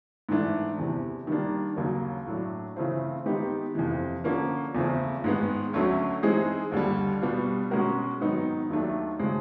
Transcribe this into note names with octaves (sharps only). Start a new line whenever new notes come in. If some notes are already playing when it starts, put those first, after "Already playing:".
G#2 E3 A3 D4
E2 C3 E3
D#3 G3 A#3 D4
D#2 C#3 F#3 A#3
A2 F#3 A3 D4
C#3 E3 A3 C4 F4
D#3 G#3 B3 D#4 G4
F2 C3 E3
D3 F3 A#3 C#4
E2 C#3 F3 A3 C4
G#2 D#3 G#3 B3
D2 D3 F#3 A3 C#4
E3 G#3 C4 D#4 G#4
D#2 D3 G3
B2 G3 B3 D4 F4
B2 G#3 C#4 F#4 A#4
G#2 D#3 F#3 B3 D#4
D#2 D#3 F#3 A3 D4
C#3 F3 G#3 C4